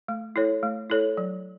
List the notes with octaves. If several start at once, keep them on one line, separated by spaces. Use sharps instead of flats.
A3
E4 A4 C#5
A3
E4 A4 C#5
F#3